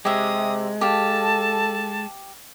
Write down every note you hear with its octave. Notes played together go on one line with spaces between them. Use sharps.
C3 G#3 G4 E5 D#6
G4 A4 F5 A5